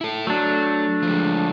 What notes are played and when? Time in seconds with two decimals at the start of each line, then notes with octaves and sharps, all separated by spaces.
0.01 E4 A4
0.27 F#3 A3 D4
1.03 F3 G#3